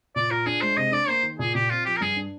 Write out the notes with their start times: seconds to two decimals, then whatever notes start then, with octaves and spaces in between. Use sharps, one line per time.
0.16 A#2 D5
0.31 F4 A#4
0.46 D4 G#4
0.61 G#3 C5
0.77 C3 D#5
0.92 D4 D5
1.08 A#3 C5
1.23 D#3
1.39 A#2 G#4
1.55 A#2 G4
1.70 C4 F4
1.85 F3 G4
1.96 A#4
2.01 G2 G#4
2.17 D4